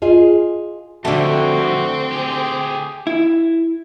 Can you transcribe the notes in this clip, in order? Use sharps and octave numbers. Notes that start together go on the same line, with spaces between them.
F4 G#4 D#5
F2 D3 G3 A3 C4 F#4
G4 G#4
E4